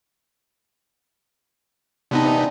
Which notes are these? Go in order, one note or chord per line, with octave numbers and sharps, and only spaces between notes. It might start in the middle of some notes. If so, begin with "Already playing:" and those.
C3 E3 B3 C4 D4 D#4